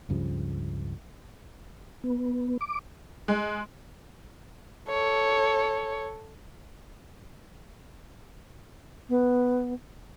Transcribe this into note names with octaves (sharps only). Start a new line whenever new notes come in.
C#2 G2 C#3 F3
B3
D6
G#3
A4 C#5
B3